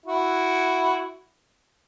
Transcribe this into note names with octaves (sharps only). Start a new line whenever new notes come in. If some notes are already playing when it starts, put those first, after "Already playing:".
E4 F#4